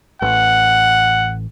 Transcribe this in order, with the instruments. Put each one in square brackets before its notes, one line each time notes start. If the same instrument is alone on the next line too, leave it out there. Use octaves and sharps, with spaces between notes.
[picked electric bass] A1 [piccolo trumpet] F#5